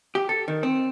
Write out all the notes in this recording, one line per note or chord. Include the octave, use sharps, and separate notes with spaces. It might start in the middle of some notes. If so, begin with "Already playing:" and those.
G4
A4
D#3
C4